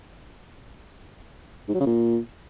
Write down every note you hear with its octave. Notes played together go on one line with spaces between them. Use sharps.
G#2
F#3
C#3
A#2